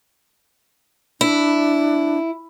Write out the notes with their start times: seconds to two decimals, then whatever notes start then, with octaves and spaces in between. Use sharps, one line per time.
1.21 D4 E4